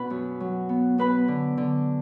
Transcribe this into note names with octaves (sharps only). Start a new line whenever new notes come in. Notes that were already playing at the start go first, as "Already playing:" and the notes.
Already playing: B2 B3 D4 B4 B5
F#2
F#3
B3
B3 B4 B5
D3
D3